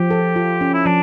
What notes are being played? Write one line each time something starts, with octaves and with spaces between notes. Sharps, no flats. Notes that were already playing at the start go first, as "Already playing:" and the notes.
Already playing: F3 G4
A4
F4
C#4
E4
F3 D4